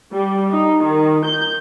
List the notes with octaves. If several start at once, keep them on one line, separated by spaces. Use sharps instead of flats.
G3
D#4
D#3
G6